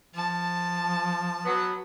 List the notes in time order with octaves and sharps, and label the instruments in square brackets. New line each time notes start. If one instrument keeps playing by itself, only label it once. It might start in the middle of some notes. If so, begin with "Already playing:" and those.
[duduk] F3 [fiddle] A5
[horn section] F#3 B3